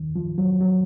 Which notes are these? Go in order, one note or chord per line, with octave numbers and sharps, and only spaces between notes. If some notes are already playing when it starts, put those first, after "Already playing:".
Already playing: D#2 D#3
F3
F#3
F#3